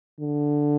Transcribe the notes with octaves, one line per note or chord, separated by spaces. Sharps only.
D3